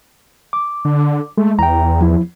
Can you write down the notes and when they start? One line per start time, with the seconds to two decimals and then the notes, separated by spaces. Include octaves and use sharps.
0.53 D6
0.85 D3
1.37 G#3 A3
1.59 E2 G5 A#5
2.01 F3 E4